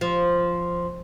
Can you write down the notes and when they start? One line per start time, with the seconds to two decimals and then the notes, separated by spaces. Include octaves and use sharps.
0.01 F3